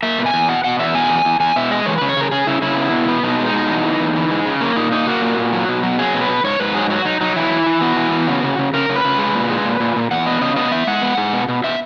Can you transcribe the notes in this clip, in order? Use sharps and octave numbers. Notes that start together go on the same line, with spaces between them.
A#3 E5
B2
G#5
E2
B2 F#5
B2 F#5
E2 E5
B2 G#5
E2
E2
E2 G#5
B2 E5
G#3 D#5
E3 C#5
C#3 B4
C#5
C#3 A#4
C#3 G#4
C#3 E4
C#3 E4
B3
B2
B3
B2 D#4
G#3
D#4
B2
E2
E3
E2
E3
G#3
C#3
A#3 C#4
A#2 D#4
A#3 D#4
A#3 F#4
A#2
A#2
F#3
B2
F#3
F#3 G#4
B2
B4
B2
G#2 C#5
G#2 B4
F#3 G#4
F#3 F#4
F#3 D#4
F#3 D#4
E3 E4
E3
E3
B3 F#4
E3
B3
C#3 F#4
C#3
C#3
C#3 A#4
C#3
B4
C#3
G#3
A#2
G#3
A#2
A#2
A#2
E2 F#5
B3 D#5
C#3 D#5
B3 D#5
E2 E5
G#3 F#5
B3
G#3
B2
B2
B2 E5